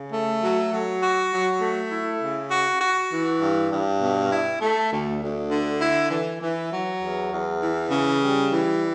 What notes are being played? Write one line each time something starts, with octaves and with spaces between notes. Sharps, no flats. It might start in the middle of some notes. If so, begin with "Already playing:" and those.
Already playing: C#3
A3
F#3
F#3
F#4
F#3
A3
E4
C#3
F#4
F#4
E3
G2
G2
B2
E4
A3
D2
D2
D3
E4
E3
E3
F#3
E2
E2
E3
C#3
G3
E3